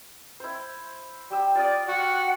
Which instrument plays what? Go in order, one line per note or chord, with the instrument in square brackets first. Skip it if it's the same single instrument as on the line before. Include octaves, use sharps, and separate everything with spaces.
[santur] E4 C5
G3 G4 E6
[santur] F4 G5 D#6 [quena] D5
[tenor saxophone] F#4 [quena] F#5